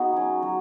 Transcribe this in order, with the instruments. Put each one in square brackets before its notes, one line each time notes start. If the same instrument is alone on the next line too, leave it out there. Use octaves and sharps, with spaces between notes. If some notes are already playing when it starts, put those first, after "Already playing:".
Already playing: [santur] B3 D#4 F#4 G#4
F#3 C#4
F#3